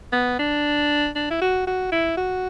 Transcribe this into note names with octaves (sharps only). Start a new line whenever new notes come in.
B3
D4
D4
E4
F#4
F#4
E4
F#4